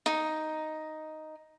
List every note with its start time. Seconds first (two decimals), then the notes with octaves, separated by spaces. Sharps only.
0.06 D#4